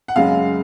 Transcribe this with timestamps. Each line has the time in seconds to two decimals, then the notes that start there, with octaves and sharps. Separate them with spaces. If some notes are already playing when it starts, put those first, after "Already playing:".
0.08 F#5
0.16 F#2 C#3 G#3 F5